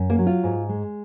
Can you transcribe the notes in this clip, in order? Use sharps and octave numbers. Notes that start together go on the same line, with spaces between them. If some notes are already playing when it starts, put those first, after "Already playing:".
Already playing: F#2
A#3
F#3
F4
G#2
G#3